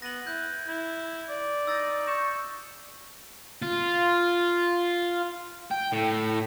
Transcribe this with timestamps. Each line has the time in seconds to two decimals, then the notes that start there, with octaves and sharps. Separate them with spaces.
0.02 B3 A#6 D#7 F#7
0.27 E4 F#6 G6
0.67 E4
1.29 D5
1.67 D#4 E6 A6 A#6
2.08 C#6 G6 E7
3.62 F4
5.71 G5
5.92 A2